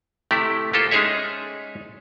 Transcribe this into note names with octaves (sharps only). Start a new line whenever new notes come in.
C3 A3 E4 G4
A#3 F4 G4 A4 C5
G#3 C#4 D#4 G#4 C#5 E5